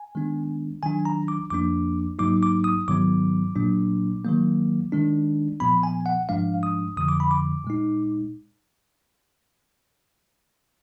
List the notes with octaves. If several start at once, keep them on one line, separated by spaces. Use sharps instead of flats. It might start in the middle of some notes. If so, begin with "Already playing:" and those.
Already playing: G#5
D#3 G#3 B3 D4
D#3 F#3 D4 G#5
A#5
D6
F2 F3 A#3 D4 D6
G#2 F#3 A#3 D#4 D6
D6
D#6
G#2 D#3 F#3 B3 D6
A#2 F#3 A#3 D4
D#3 F#3 A#3
D#3 G#3 D4
A#2 F3 B3 B5
G#5
F#5
G#2 F3 G#3 D4 F5
D#6
F2 D3 F3 D#6
D6
B5
D6
A#2 G#3 D#4